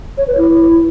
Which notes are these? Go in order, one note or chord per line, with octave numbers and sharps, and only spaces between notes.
C#5
B4
E4